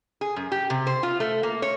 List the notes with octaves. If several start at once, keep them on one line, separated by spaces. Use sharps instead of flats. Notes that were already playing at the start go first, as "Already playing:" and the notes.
G#4
F#2
G4
C3
C5
F4
A3
A#3
C#5